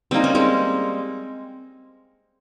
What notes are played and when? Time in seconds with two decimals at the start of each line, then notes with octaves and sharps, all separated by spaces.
0.11 G3 A#3 C4 D#4
0.24 C#4
0.35 G#3 C4